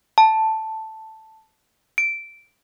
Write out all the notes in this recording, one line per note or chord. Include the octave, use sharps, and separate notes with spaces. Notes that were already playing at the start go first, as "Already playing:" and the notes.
A5
D7